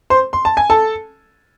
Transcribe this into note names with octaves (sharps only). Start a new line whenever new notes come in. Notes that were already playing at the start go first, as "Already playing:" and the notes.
C5 C6
C6
A5
G#5
A4 A5